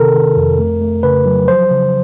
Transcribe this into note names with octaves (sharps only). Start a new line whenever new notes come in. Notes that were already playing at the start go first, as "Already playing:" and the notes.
Already playing: C3 D#3 A4 A#4
D#3
F2
A3
A3
C#3 B4
F#3
F3 C5
C#3